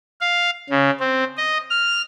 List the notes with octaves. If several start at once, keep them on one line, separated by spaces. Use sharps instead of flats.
F5
C#3
C4
D#5
F6